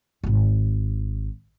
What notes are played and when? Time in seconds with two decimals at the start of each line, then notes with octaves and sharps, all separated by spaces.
0.24 D#1 G#1